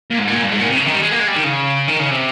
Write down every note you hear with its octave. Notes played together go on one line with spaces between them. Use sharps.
A#2
G#2
A#2
G2
G#2
A#2
C3
C#3
D#3
G3
G#3
A#3
G#3
G3
D#3
C#3
D#3
C#3
C3